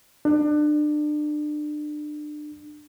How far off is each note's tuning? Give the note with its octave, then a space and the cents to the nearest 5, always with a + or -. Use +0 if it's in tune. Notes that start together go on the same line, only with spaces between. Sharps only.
D4 +30